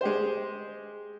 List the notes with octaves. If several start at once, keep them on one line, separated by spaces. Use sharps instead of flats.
G#3 G4 C5